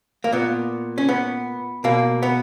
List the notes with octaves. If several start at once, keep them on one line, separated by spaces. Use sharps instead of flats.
A#3
A#2 B3
C#4
B3
B2 A#3
B3